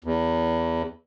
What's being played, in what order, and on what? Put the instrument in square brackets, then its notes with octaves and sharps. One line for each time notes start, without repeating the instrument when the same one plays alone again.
[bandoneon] E2